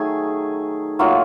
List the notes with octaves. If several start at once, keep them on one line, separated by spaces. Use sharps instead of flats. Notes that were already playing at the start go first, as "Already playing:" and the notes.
Already playing: D#3 F#3 A3 G#4 G#5
A2 F#3 A#3 D#4 F4 F5